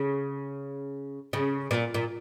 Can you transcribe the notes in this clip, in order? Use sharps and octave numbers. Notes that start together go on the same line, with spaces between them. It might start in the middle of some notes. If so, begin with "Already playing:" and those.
Already playing: C#3
C#3
A#2
A#2